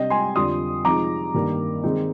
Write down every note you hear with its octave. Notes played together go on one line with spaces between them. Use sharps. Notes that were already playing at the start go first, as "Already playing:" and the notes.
Already playing: C3 G3 D4 D#5 G5
G#5 C6
F2 D3 G3 D4 F4 C6 D#6
C3 F3 G#3 D#4 A#5 D6
G2 D#3 A#3 D#4
D#3 G#3 C4 D#4